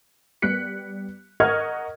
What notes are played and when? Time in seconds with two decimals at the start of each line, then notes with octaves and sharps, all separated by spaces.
0.42 G3 B3 F#6 B6 C#7
1.40 A#4 D#5 F#5 C#6 F6 G#6